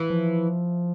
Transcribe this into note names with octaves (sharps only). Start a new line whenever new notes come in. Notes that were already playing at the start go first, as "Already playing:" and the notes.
Already playing: E3
F3